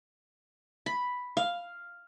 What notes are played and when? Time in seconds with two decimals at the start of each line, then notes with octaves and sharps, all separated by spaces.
0.86 B5
1.37 F5